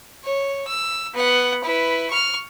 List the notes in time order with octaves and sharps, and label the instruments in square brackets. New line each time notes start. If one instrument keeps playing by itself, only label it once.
[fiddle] C#5
E6
B3 F#5
E4 B4
C#6 F6